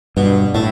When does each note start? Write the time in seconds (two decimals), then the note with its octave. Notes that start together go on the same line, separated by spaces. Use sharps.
0.17 G2 B2
0.55 A2 A3